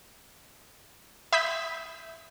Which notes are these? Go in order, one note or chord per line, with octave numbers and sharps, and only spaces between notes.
E5 B5 D#6 G6 B6